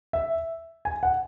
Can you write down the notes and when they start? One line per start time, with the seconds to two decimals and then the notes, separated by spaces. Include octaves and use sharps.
0.13 E5
0.85 G#5
1.03 F#5